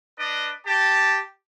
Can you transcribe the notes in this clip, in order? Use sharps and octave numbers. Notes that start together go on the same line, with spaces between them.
D4 B4 D5 D#5
G4 A5